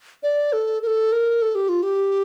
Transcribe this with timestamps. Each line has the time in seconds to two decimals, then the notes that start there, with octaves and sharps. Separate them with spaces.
0.23 D5
0.53 A4
0.83 A#4
0.87 A4
1.12 A#4
1.42 A4
1.55 G4
1.69 F4
1.83 G4